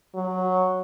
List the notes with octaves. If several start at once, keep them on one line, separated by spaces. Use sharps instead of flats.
F#3